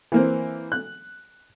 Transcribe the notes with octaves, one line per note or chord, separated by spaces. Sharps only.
E3 A#3 C4
F#6